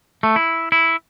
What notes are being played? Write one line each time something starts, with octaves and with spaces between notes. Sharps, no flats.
A3
E4
E4